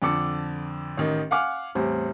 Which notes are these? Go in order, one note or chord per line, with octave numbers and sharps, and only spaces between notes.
F2 D3 D4 D6 C#7
A1 D#3 D#5
F5 F#5 G#5 D6 F6
E2 A2 G3 C4